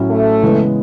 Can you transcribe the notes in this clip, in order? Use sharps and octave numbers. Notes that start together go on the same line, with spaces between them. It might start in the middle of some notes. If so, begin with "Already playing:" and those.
Already playing: A2 F#3 C#4 E4
A3
C#3 E3 G#3 B3 E4